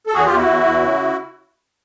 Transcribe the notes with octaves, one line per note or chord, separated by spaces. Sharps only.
A4
E2 F#4 G#4
F4 G4
E2
E4 F#4
E2
E2
C#3